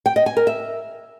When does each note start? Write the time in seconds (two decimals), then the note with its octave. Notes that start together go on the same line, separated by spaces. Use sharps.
0.06 G5
0.16 D#5
0.26 G#5
0.37 A#4
0.47 E5